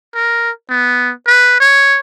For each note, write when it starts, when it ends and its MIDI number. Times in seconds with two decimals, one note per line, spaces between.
0.15 0.51 70
0.69 1.12 59
1.27 1.58 71
1.60 1.99 73